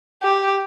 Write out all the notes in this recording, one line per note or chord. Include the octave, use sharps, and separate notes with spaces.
G4